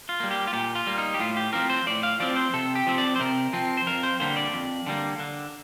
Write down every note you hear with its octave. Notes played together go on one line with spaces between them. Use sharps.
F4
G3 A#3
G4
F4
A#2 G4
F4
G3 A#3
D#4
G4
A2 F4
G4
F3 C4 A#4
C5
A2 D5
F5
F3 C4 D5
C5
C3 A4
G4
F3 C4
D5
C5
C3 A#4
F3 C4
C5
F2 A#4
C5
D3 G3 A#3 C5
D5
F2
D3 G3 A#3
D3